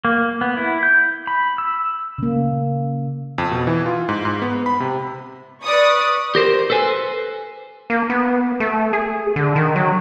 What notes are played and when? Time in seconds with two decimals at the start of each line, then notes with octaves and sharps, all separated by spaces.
0.05 A#3
0.41 B3
0.57 E4
0.83 G6
1.27 B5
1.58 E6
2.18 C#3 A#3
3.38 F2
3.51 B2
3.67 E3
3.86 F4
4.09 G#2
4.25 G#2
4.42 B3
4.66 B5
4.80 C3
5.63 B4 D5 C#6 D#6
6.35 G4 A#4 C5
6.70 A4 B4 C5 G#5
7.90 A#3
8.10 B3
8.60 A3
8.93 G#4
9.36 D3
9.56 D#3
9.76 F#3